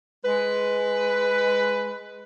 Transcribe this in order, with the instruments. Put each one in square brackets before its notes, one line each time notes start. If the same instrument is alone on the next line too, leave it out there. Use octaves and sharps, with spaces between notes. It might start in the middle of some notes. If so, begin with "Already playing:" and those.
[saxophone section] G#3 B4